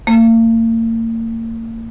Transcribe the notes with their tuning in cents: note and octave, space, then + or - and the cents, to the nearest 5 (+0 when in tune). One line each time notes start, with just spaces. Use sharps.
A#3 -40